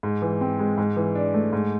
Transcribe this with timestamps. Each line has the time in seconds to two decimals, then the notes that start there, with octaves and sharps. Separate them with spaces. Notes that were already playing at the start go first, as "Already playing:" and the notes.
0.03 G#2
0.22 E3
0.41 C4
0.59 G#3
0.78 G#2
0.97 E3
1.15 D4
1.34 A3
1.53 G#2